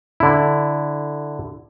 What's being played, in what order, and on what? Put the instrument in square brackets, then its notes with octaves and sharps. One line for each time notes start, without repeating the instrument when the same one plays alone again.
[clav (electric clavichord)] D3 E4